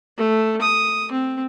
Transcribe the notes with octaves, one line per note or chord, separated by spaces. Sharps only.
A3
D#6
C4